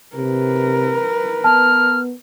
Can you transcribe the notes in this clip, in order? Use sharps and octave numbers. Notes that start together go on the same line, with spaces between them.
C3 A#4 B4
B3 A5 F6